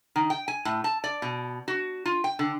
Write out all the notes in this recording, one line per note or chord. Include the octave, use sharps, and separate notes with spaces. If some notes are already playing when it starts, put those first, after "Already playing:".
D#3
G5
G#5
A2
A5
D5
B2
F#4
F4
G5
D3